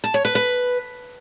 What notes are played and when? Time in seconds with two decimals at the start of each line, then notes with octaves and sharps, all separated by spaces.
0.04 A5
0.14 C#5
0.25 B4
0.35 B4